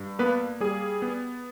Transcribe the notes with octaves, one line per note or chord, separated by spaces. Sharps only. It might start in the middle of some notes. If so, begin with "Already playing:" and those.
Already playing: G2
A#3 B3 B4
G3 G#4
B3